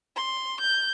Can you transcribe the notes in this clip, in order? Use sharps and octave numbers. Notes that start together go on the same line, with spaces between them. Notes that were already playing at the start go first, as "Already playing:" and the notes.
C6
G6